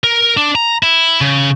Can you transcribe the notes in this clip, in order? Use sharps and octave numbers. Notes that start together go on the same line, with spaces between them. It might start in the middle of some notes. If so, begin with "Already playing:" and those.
A#4
D4
A#5
E4
C#3